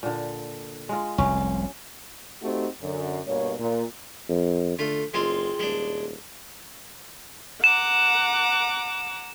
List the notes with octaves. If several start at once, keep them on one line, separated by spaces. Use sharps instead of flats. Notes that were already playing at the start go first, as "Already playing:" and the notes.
A#2 D3
G#3 F4
F1 C2 C#4
A3 C4 D#4 F#4 G4
F#2 D3
G2 B2 A#3 C#5
A#2
F2
D3 A3 F4
F#1 G#3 C4 F4
D#1 G#3 D4
F#5 A#5 D6 E7